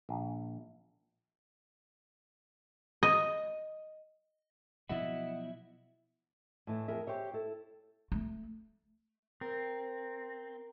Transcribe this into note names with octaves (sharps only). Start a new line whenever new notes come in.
A#1
D#5
B2 F3 F#3 E4 D#5 F#5
A2 E3
F2 G#4 A#4 E5
G4 C5 C#5 E5
E4 A4
A3
C4 A#4